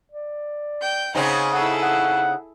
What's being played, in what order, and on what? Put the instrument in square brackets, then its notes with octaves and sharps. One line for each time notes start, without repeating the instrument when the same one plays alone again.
[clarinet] D5
[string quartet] G5 G6
[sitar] C#3 C4 D#4 [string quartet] F#5 G#5
[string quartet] E4 G#4 A4 [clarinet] F#5
[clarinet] F#5